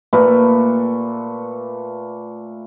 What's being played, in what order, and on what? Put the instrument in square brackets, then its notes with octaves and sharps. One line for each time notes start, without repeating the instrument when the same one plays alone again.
[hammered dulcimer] A#2 A3 A#4 B4